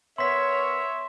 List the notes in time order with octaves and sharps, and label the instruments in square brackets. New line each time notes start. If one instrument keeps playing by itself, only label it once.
[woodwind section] B3 A#4 C#5 [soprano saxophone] E5 [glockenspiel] C6 B6